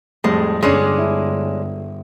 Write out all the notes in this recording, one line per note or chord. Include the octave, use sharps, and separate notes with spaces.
F2 A2 G3 G#3
G1 G#3 C#4 D4 C#5 D5 C6
E4